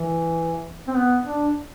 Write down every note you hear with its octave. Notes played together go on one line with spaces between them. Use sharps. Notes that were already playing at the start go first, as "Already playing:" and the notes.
Already playing: E3
C4
B3
D4